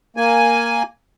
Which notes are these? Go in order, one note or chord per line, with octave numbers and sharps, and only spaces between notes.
A#3 G#5